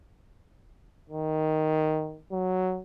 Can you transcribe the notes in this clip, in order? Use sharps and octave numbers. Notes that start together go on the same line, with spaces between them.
D#3
F#3